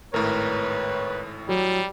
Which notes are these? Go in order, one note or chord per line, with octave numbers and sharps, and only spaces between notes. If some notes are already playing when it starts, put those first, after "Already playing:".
G#1 A2 A#4 B4 C#5
F#3 G3